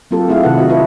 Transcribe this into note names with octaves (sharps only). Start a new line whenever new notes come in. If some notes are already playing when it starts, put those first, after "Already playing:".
F#3 A#3 C4 F4 G4 A4
A3 C4 E4 F4 G#4 F5
C3 D#3 E4 A4 B4 F#5
F4 F#4 D#5
E4 F4 A4 B4